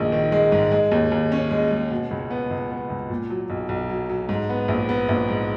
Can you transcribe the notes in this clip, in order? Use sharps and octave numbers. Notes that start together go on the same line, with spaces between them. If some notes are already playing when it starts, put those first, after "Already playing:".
Already playing: A#1 D#3 G#3
D#3
G#3
G#2
G#3
D#2
D#2
C#4
G#3
G#3
B2
C#2
B3
C#2
B3
C#2
A#2
F#3
B1
B1
F#3
F#3
G#2
B3
A#1
B3
A#1
G#2